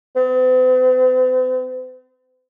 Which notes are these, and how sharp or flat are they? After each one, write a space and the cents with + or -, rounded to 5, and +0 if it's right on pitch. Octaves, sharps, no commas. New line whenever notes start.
C4 -45